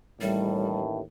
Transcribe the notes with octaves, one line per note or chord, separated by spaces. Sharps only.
A1 D#2 A2 G3